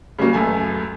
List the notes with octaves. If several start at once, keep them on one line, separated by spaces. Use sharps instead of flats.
C#3 F#3 G3 A#3
C#2 F#2 A3 G#5